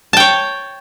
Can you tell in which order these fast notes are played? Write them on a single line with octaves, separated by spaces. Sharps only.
A5 G5 C#5